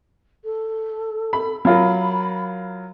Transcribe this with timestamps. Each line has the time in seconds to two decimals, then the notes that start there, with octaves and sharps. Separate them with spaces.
0.44 A4
1.33 B5
1.65 F#3 F4 A#4 B5